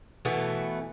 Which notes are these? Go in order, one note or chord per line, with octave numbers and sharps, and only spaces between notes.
B2 E3 A3 B3